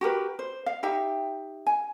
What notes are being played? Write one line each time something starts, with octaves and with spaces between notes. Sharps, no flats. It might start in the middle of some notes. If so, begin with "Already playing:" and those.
F#4 G4 A#4 B4
C5
F5
D#4 G4 E5 G5
G#5